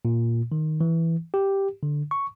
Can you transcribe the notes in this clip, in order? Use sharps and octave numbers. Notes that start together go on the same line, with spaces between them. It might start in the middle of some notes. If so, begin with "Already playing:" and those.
A#2
D#3
E3
G4
D3
C#6